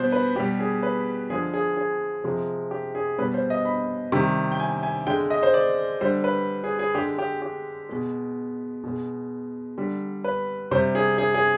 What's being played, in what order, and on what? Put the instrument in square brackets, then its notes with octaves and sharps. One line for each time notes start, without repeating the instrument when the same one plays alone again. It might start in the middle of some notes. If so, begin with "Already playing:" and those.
Already playing: [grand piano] B2 G3 C5
B4
B2 G4
G3
G#4
B4
D3 F3 G#3 G#4
G#4
G#4
C3 F3 G#3
G4
G#4
B2 G3 B4
C5
D#5
B5
C3 D#3 G3
G5
G#5
G#5
D3 G#3 G5
D#5
C5
D5
D3 G3 C5
B4
G#4
G#4
D3 G#3 G4
G4
G4
B2 G#3
B2 G#3
D3 G3
B4
C3 G3 C5
G#4
G#4
G#4